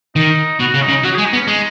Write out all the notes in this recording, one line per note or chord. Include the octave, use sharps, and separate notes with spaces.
D#3 D#4
B2 F#4
C#3
D#4
C#3
F#3 F#4
G#3 G#4
D#4
B3
C#4
G#3 D#4